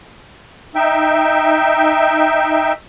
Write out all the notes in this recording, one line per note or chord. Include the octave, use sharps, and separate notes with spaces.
D#4 E5 G5